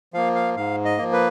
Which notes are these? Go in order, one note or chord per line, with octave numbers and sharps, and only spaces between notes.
F3 A#3 F5
F5
G#2 F5
D#5
F3 A#3
B4